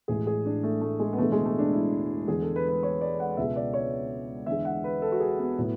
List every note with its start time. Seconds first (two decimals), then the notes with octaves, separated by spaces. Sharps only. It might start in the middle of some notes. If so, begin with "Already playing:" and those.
0.08 A1 A2 G#3 G#4
0.27 G#4
0.46 D4
0.63 A3
0.81 A3
0.99 G#3
1.13 B3
1.18 E1 E2 D3 G#3 A3
1.32 G#3
1.45 A3
1.59 D4
1.73 E4
2.27 E2 D3 G#3 G#4
2.42 A4
2.56 B4
2.68 B4
2.83 C#5
3.01 D5
3.20 F#5
3.37 C#2 B2 G#3 E5
3.56 D5
3.74 C#5
4.46 E2 D3 G#3 E5
4.65 F#5
4.84 B4
5.02 A4
5.12 F#4
5.20 G#4
5.39 B3
5.58 A2 F#3